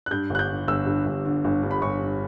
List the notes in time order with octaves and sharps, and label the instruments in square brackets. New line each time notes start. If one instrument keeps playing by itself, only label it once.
[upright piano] F#6
G2 G6
G1 F#6
G6
D3
G1 E6
G2
G1
D3
G1
G2
B5
G1 C#6
D3